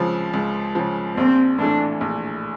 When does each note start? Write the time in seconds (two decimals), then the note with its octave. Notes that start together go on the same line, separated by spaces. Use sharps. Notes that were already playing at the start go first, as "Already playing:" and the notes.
Already playing: C#2 C#3 F3
0.34 C#2
0.75 C#3 F3
1.17 A#1 C4
1.59 A2 E3 A3 D4
2.01 A#1